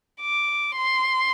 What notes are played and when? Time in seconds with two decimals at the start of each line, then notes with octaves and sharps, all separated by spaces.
0.22 D6
0.77 C6